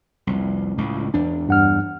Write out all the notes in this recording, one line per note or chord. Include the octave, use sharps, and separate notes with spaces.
C2 F2
C#2 A2
E2 D4
G2 F#5 F6